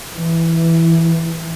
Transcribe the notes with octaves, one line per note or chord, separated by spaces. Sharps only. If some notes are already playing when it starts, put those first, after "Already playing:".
E3